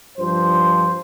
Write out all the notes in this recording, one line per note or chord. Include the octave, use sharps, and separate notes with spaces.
G2 F3 C5